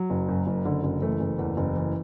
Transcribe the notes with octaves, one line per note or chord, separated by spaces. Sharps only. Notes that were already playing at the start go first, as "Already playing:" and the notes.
Already playing: F#3
F#1
F#2
F#1
D3
F#1
E3 A3
F#1
E2
F#1
E3